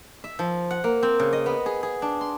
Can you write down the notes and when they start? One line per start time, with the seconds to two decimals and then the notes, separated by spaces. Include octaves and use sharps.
0.24 E5
0.39 F3
0.71 F#5
0.84 A#3
1.03 C4
1.20 C#3
1.33 D#5
1.46 B3
1.66 G#4
1.83 G#4
2.02 D4
2.21 C6